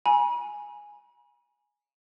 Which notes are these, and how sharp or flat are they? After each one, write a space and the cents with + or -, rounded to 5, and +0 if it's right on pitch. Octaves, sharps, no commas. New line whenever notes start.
G#5 +0 B5 -45